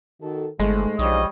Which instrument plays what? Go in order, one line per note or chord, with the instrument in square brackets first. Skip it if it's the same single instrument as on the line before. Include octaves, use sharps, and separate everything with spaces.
[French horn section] D#3 F#4 A4
[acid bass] G1 [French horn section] G#2 A3 [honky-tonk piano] G#3
[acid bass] B1 [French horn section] F3 D4 D#4 [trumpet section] G3 C#5 D#5